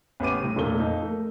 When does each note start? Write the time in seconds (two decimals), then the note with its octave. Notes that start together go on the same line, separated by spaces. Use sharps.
0.20 A1 B3 G4 D6 D#7
0.40 A2 C3
0.56 E1 A#2 A3 G7
0.79 F2 D#4
1.02 A3 A#4